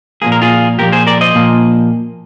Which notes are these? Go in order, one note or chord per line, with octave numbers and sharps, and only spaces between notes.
A#2 F3 A#3 G#4
A#4
F4 G#4
A#2 F3 A#3 G4 A#4
G#4 C5
A#4 D5
C5 D#5
A#2 F3 A#3